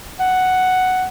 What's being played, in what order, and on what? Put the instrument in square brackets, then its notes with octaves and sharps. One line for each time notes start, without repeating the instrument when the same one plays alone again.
[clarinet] F#5